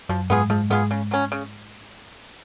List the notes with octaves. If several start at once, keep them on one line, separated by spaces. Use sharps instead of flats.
F#2 F3 F#3
G#2 G#3 B3 F4 G#4
G#2 F3 G#3
G#2 G#3 B3 F4 G#4
C#3
F#3 C#4
C#3